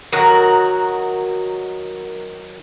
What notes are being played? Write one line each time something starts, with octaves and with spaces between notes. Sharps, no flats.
D#3 F#3 F#4 A#4